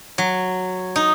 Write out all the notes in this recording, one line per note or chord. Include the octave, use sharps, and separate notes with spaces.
F#3
D#4